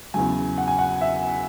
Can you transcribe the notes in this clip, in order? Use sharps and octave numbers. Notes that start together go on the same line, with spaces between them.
E2 C#3 F#3 G#5
F#5
G#5
F#5
E5